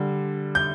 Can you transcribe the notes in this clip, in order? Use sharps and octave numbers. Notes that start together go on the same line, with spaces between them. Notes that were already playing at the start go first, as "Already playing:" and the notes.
Already playing: D3 G3
G6